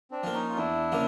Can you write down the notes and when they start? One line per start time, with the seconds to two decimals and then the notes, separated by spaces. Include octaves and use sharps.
0.11 C4 D4
0.23 F3 A#3
0.34 C#4 D#4
0.49 F4
0.57 E2 D4 E4
0.92 C#3 F3 A#3